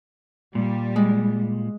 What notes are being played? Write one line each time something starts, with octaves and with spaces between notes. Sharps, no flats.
A#2 G3
G#3